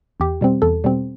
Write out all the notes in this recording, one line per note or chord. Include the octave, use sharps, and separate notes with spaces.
E2 G4
B2 G3 C4
E2 A4
B2 G3 C4